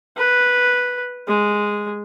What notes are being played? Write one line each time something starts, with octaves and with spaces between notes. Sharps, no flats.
B4
G#3